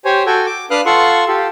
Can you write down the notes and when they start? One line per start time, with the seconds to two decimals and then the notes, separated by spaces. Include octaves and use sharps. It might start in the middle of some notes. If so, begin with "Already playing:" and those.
0.05 G4 C5 C#5 G#5
0.26 F#4 A4 G5 G#5
0.46 D6
0.71 D4 B4 F5 D#6 F6 F#6
0.86 F4 A4 F#5 C6 C#6
1.28 F4 G4 A4